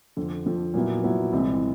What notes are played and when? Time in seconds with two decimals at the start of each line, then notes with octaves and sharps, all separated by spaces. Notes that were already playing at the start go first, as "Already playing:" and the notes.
0.17 F2 D3 F3
0.46 F2 D3 F3
0.74 A#2 F#3 B3 E4
1.03 A#2 F#3 B3 E4
1.33 C2 C3 E3 G#3 C4